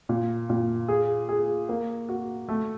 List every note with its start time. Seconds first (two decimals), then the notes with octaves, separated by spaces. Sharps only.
0.09 A#2
0.50 A#2
0.88 G#4
1.29 G#4
1.69 A#3
2.09 F#4
2.48 A3